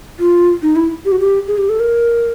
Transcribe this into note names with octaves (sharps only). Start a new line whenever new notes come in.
F4
D#4
E4
G4
F#4
G4
G#4
G4
A4
A#4